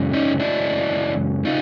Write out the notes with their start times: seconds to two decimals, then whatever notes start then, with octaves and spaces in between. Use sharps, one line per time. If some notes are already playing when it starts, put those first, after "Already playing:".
Already playing: F#2 C#3 E3 G#3
0.13 C#4 D#4
0.40 D4 E4
1.45 C#3 D#4 F4